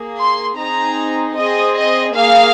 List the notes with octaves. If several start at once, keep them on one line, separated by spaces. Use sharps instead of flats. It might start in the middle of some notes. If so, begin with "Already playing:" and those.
Already playing: A#3 G#4
C6
C4 D#4 G#4 A#5
C4 G#4 D#5
D#5
A#3 G#4 F5